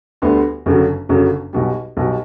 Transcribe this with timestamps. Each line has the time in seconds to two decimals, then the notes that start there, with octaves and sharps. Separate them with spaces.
0.22 D2 D3 G3 B3
0.66 G1 F#2 C#3 F#3
1.09 G1 F#2 C#3 F#3
1.53 B1 B2 G3
1.97 B1 B2 G3